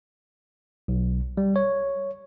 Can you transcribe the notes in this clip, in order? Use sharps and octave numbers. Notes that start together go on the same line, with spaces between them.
B1
G3
C#5